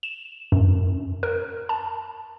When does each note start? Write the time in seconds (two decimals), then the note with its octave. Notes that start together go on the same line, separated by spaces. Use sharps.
0.03 E7
0.52 F#2
1.23 A#4
1.69 A5